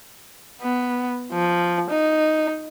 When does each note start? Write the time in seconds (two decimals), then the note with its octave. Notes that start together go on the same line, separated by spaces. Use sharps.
0.62 B3
1.32 F3
1.90 D#4